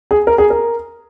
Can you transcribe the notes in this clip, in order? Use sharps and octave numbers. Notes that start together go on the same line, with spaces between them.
G#4
A#4
G#4
A#4